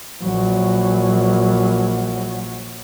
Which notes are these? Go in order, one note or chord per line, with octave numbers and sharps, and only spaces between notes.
A#1 F#3